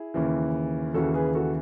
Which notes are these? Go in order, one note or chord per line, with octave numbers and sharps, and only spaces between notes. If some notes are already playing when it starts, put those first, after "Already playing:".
Already playing: E4 G#4
D#2 C#3 E3
D#2 C#3 E3 F#4 A4
G#4 B4
F#4 A4